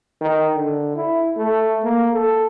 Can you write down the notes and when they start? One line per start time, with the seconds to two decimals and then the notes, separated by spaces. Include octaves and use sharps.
0.21 D#3
0.55 D3
0.96 E4
1.37 A3
1.84 A#3
2.14 A4